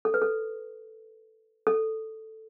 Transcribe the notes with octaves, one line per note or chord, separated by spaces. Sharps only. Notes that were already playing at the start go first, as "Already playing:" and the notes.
A4
B4
A4
A4